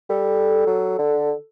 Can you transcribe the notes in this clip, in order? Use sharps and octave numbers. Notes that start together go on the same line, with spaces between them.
G3 A4
F#3
D3